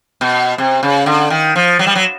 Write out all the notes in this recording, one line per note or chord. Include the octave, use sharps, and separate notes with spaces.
B2
C3
C#3
D3
D#3
F3
F#3
G3
F#3